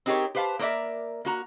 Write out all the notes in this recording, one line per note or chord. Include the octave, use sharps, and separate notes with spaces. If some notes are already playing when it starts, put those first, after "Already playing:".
C4 D#4 G4 G#4 A#4 C#5
G4 B4 C5 F5 A5
A#3 A#4 C5 D5 E5
A#3 F#4 A#5